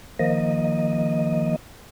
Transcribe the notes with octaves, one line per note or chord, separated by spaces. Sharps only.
D#3 F3 A#3 D#5